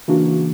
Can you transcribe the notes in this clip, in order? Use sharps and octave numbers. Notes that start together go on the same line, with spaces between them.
C#3 E3 A#3 D4 F#4